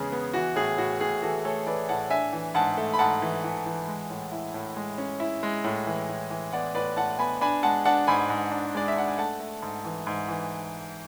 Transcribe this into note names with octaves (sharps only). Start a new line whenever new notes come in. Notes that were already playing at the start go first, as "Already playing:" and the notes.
Already playing: E2 C#3 G#3 B3 G#4
B3
E3 F#4
A2 G#4
A2 F#4
A2 G#4
E3 F#4 A4
A3 A4 C#5
E3 B4 D5
A2 F#5 A5
D4 E5 G#5
E3
G#2 F#5 A5
A3
B5
G#2 F#5 A5
E3
E3
E3
G#3
A2
E4
A2
G#3
C#4
E4
G#3
A2
E3
A2
E3
B3 D5 F#5
A2 B4 D5
A2 F#5 A5
B3 G#5 B5
D4 G#5 B5
G#3 F#5 A5
D4 F#5 A5
G#2 G#5 B5
G#2
D4
G#3 D5
E5
D4 F#5
G#5
A3 F#5 A5
A3
G#2
E3
G#2
E3